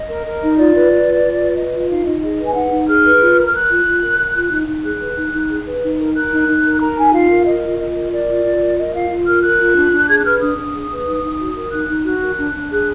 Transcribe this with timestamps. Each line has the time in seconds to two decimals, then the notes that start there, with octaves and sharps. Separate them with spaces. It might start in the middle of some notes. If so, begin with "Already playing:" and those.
Already playing: D#5
0.09 A#4
0.25 A#4
0.42 D#4
0.58 F4 D5
0.75 B4
0.91 B4
1.07 F4
1.24 F4
1.41 B4
1.57 B4 D#5
1.74 F4
1.79 D#5
1.90 D#4 F5
2.06 D#4 D#5
2.22 G#4 D#5
2.38 B4
2.44 G#5
2.55 D#4 F#5
2.72 D#4
2.88 G#4 F6
3.04 B4
3.21 F4
3.36 A#4
3.46 F6
3.53 A#4 F#6
3.70 F4
3.86 F4
4.03 A#4
4.19 A#4
4.35 F4
4.51 D#4
4.68 D#4
4.84 G#4 F#6
5.00 B4
5.17 D#4
5.34 D#4
5.50 G#4
5.66 B4
5.82 D#4
5.99 A#4
6.15 A#4 F#6
6.33 D#4
6.48 D#4
6.65 A#4
6.81 A#4 A#5
6.98 D#4 G#5
7.14 F4 F5
7.30 A#4
7.46 A#4 D#5
7.63 F4
7.79 F4 D#5
7.96 A#4
8.12 A#4 D5
8.29 F4
8.44 F4
8.61 A#4
8.78 A#4 D#5
8.94 F4 F5
9.10 F4
9.27 A#4 F6
9.43 A#4 F#6
9.59 F4
9.76 D4
9.92 D4
10.09 G#4 G#6
10.17 F#6
10.25 B4 F6
10.41 D4 D#6
10.58 D4
10.74 G#4
10.90 B4
11.06 D#4
11.23 D#4
11.40 F#4
11.56 A#4
11.72 D#4 F#6
11.89 D#4
12.05 F#4 F#6
12.22 A#4
12.38 D4
12.54 D4
12.71 G#4 F#6